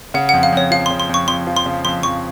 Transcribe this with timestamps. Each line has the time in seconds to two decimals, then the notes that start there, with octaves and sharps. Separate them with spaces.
0.14 C#3 F#5
0.29 F2 F#5
0.43 F5
0.52 F2 C#5
0.71 F3 F5
0.86 C#3 C6
1.00 C6
1.09 F2 C#6
1.28 F2 C6
1.47 F3
1.56 C6
1.66 C#3
1.85 F2 C6
2.03 F2 C#6